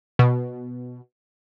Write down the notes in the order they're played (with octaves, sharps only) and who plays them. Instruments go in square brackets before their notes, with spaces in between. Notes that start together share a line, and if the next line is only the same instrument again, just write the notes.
[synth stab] B2